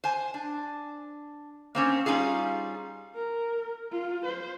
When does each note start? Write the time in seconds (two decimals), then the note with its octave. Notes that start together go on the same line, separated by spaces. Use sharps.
0.04 C5 G#5
0.34 D4
1.75 A#3 C4 C#4
2.06 G3 C#4 D#4 F4 G#4
3.15 A#4
3.92 F4
4.25 C5